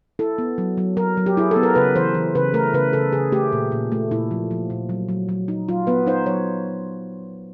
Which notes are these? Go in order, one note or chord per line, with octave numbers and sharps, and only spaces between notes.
E4 A4
B3
F#3
F#3
F#3 A#4
F#3
G4
E4 G#4
B3 A4
A#4
C#3 B4
E3 C5
E3
C#3 B4
A3 A#4
C#3 B4
C#3 A4
C#3 G#4
A3 G4
A#2
A#2
A3
A#2 E4
F3
F3
A#2
F#3
F#3
F#3
D#4
F#3 F4
B3 B4
D#4 C5
F#3 C#5